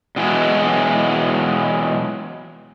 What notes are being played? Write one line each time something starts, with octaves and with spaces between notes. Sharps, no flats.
B2 E3 F#3 G#3